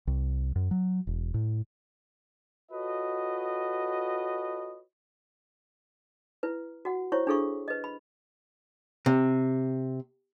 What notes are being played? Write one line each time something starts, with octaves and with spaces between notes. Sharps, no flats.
C2
F#2
F#3
E1
A2
F4 F#4 A4 B4 C#5 D#5
E4 B4
F#4 F#5
E4 C5 C#5 C#6
D4 E4 G#4 A4 F5 C#6
B4 D#5
B5
C3